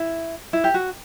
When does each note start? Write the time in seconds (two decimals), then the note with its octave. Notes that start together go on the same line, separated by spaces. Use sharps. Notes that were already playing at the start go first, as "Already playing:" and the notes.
Already playing: E4
0.53 E4
0.64 G4
0.74 F#4